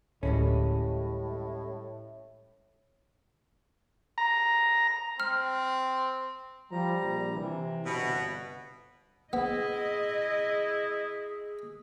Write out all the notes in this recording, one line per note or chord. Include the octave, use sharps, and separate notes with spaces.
D1 A2 G3 G#3 C#4
A#5
C4 F6
F3 G3 A#5
A#1
C3 E3
G1 B2
B3 E4 G#4 D#5